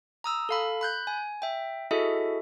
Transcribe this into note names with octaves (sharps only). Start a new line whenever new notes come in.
A#5 D#6 E6
A4 F5 B5
B5 F#6 G6
G#5
E5 G5
E4 F#4 G#4 A4 D#5 E5